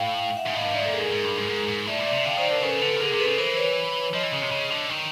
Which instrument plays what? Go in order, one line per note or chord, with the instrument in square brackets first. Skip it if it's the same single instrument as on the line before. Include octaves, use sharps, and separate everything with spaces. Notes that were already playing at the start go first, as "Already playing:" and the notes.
Already playing: [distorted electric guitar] A2 [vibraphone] F5 G5
[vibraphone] E5 F#5
[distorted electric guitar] G#2
[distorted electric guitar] A2 [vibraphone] D#5 F5
[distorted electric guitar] G2
[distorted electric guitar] G#2 [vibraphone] D5 E5
[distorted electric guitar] A#2 [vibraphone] A4
[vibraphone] G#4 A#4
[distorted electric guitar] G#2
G#2
G2
G#2
G#2
G#2
[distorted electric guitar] A2 [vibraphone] D5 E5
[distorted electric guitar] A#2
[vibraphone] D5 E5
[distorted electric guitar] C3
[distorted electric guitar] D3 [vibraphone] F5 G5
[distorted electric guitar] D#3 [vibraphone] C5 D5
[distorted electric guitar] D3 [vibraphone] A#4 C5
[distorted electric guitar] C#3 [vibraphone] A4 B4
[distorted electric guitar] D3 [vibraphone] A4 B4
[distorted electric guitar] C#3
[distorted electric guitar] D3 [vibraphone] G#4 A#4
[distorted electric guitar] C3
[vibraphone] A4 B4
[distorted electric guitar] C#3
[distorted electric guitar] E3 [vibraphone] A#4 C5
[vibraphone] B4 C#5
[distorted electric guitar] F3 [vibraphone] C#5 D#5
[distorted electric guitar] E3
C#3
C3
C#3
D3
D#3